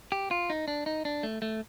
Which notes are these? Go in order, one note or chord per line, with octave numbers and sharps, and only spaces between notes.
G4
F4
D#4
D4
D#4
D4
A3
A3